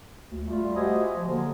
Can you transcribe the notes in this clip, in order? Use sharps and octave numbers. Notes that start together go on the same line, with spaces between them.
D2
G3 A3 F4
F#4 G4 C5 D#5 E5 G#5
F3
D3 A#3